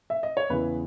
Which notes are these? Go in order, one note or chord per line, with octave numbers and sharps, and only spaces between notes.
E5
D#5
C#5
E2 C#3 E3 B4